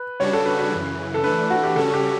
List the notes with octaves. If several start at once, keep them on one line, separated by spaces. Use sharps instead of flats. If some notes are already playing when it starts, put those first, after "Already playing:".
Already playing: B4
C#3 G3 D4 F#4 C#5
A4
B4
B4
F#2 C#3 E3
A4
E3 A3 D4 B4
F#4
G4
C#3 G3 C#4 F#4 A4
G4